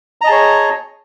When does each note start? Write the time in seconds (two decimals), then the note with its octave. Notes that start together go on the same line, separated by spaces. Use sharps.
0.21 A#5
0.24 D#5
0.27 A5
0.29 G#4
0.32 C#5